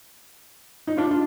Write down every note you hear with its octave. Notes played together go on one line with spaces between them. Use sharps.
D#4
D4 F4
F4